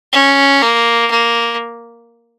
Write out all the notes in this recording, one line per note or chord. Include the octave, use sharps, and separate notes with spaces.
C#4
A#3
A#3